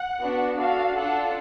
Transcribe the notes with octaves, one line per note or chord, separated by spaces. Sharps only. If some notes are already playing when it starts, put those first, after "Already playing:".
Already playing: F#5
B3 D4 F#4
D4 F#4 A4 F5
D4 F4 A4 F#5